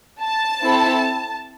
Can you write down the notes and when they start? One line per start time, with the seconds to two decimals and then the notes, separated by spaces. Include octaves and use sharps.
0.21 A5
0.62 C4 E4 A4